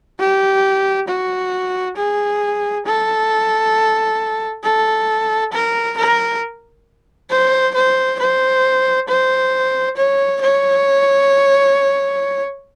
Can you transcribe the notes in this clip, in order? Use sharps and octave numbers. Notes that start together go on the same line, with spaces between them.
G4
F#4
G#4
A4
A4
A#4
A#4
C5
C5
C5
C5
C#5
C#5